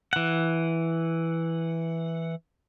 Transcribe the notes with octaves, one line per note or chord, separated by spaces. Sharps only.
E3 F#5